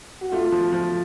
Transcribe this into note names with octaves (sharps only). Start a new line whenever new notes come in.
F#4
A3 F4
F3
F3